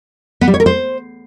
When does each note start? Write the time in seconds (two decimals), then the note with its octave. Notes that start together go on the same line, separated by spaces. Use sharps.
0.41 B3
0.48 G3
0.54 C#5
0.60 A#4
0.66 C5